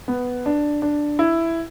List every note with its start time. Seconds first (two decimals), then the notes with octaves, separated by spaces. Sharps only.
0.08 B3
0.46 D4
0.82 D4
1.19 E4